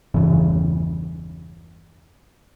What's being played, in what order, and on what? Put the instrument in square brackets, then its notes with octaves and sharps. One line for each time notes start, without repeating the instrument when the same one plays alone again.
[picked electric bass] G1 E2 C#3